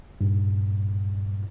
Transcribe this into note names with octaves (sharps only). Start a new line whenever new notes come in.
G2 A#2